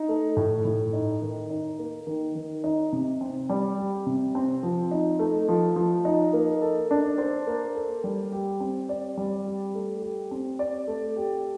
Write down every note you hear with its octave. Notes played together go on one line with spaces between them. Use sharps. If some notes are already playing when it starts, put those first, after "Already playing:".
Already playing: D#4
A3
A2
A2
D#4
D#3
D#4
A#3
D#3
D#3
D#4
C3
C4
G3
G4
C3
C4
F3
D#4
A3
F3
F3
D#4
A#3
A4
D4
C5
A#3
A4
G3
G4
C4
D5
G3
G4
A3
G4
C4
D5
A3
G4